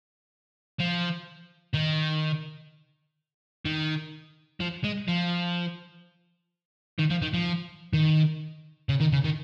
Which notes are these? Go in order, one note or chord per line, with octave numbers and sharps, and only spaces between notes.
F3
D#3
D#3
F3
G#3
F3
D#3
F3
D#3
F3
D#3
C#3
D#3
C#3
D#3